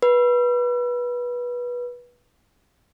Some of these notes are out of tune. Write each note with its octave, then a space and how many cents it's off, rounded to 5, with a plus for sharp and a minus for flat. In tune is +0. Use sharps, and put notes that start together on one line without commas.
B4 -20